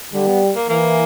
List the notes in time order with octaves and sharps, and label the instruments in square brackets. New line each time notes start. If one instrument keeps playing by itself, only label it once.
[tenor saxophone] D3 [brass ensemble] G3
[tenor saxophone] B3
A#3
[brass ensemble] E3 [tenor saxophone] A#3